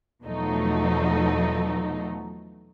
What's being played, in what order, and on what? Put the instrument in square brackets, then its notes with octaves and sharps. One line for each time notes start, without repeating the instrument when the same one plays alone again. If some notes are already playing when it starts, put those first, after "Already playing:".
[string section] E2 B2 F3 F#3 A3 D#4